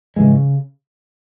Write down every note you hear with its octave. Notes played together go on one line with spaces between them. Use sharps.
G#2 C#3 E3 G#3